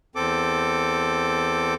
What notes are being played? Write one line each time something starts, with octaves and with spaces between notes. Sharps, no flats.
E2 C4 A4 D6